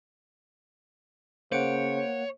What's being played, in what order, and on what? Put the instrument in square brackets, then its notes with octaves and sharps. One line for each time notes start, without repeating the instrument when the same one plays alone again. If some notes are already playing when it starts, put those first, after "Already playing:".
[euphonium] C#3 [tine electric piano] A#3 F#5 [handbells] C5 C#7 D7 [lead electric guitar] C#5